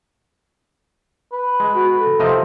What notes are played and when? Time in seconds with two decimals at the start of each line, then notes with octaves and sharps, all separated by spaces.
1.32 B4
1.60 G#3
1.74 F#4
1.96 A4
2.20 C3 F3 C4 D#5